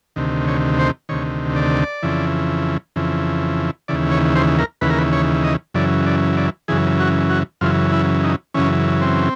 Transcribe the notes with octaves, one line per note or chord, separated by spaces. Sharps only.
D2 C3 D#3
C#5
C5
D2 C3 D#3 C#5
D5
F2 C#3 E3
F2 C#3 E3
D#2 C#3 E3 D5
C#5
C5
A#4
D#2 C#3 E3 B4
A#4
B4
C#5
D#5
F#2 C#3 E3 D5
D5
D5
F#2 C#3 E3 G#4
F#4
F#4
F#2 C#3 E3 F4
E4
D#4
F#2 C#3 E3 C#4
C4